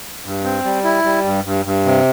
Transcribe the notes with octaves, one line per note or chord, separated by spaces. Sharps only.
G2
C4
G3
E4
G3
G2
G2
G2
C3